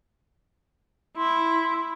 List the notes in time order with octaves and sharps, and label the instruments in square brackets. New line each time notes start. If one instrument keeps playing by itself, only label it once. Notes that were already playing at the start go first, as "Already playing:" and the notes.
[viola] E4 [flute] C6